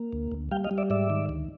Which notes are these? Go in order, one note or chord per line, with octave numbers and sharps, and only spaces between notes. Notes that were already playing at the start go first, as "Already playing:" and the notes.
Already playing: A#3
D2
D2
G3 F5 G5
D#5 F5
G3
D5 E5
G#2 D5 E5
D#3
D2